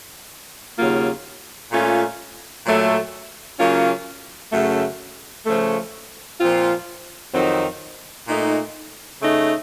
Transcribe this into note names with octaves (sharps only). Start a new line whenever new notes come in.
D#2 C#3 F#3 A#3 F4
A#2 A3 C#4 F4
A#2 F#3 A3
C#3 F#3 A#3 C#4 F4
F#2 C#3 A3
C#3 F3 A3
A#2 F3 C4 F4
F2 D#3 F#3 C4 D#4
A#2 A3 D#4
C#3 A3 D#4